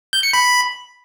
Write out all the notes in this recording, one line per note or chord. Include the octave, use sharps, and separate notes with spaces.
G6
C#7
B5